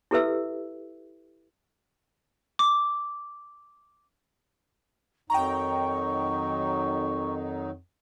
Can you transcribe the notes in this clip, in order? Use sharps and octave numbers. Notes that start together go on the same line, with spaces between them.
E4 G4 A4 B4 E5 E6
D6
F2 D#3 F#3 D#4 G5 A#5 C#6